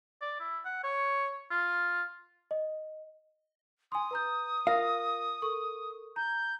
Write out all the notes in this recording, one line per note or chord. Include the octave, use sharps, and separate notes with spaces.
D5
E4
F#5
C#5
F4
D#5
G#5 C6 D#6
B4 A#5 G6
F4 A#4 F5 A#6
A4 A#4 C#6
A#5 G6